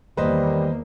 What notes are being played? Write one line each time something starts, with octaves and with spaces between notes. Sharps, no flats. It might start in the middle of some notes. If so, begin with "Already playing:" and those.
E2 D#3 G3 A#3 B4 C5 D#5